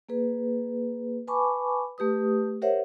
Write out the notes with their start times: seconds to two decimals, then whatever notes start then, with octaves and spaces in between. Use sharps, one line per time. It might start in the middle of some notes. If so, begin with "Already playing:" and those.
0.09 A#3 G#4 B4
1.28 B4 G#5 A5 B5 C#6 D6
1.98 A3 G4 B4 D#6
2.62 G4 A#4 C5 C#5 E5 F#5